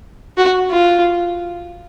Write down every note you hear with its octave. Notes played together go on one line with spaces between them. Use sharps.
F#4
F4